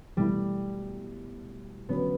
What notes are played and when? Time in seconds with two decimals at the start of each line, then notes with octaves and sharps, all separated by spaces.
0.17 B2 G3 A3 E4
1.89 D3 F#3 B3 C#4